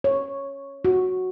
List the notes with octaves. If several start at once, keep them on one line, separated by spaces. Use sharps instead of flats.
C#5
F#4